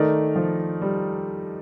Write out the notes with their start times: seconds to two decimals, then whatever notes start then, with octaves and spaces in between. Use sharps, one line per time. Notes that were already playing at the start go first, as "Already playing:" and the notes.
Already playing: D#3 A3 D#4 A#4 D5
0.36 F3
0.82 G3